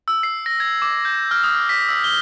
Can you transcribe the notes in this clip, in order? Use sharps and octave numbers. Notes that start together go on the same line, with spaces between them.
E6
C7
A#6
G#6
D6
G6
F6
D#6
B6
E6
G7